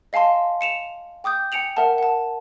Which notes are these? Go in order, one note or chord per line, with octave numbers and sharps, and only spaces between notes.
D#5 F5 G#5 A5 C6
C#7 E7 F7
G5 D6 D#6 G6
G5 G#5 C#7 D7 F7 F#7
A#4 E5 F#5 A5
F#5 A5